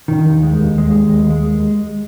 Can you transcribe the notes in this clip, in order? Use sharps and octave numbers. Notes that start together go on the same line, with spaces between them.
D#3
D#2
G#3
D#2
G#3
D#2
D#2
G#3